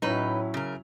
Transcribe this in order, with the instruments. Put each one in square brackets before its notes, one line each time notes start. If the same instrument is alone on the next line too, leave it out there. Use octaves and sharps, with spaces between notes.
[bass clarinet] A2 [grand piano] F#3 C#4 E4 [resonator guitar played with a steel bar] D#4 B4
[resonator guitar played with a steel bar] C#3 A#4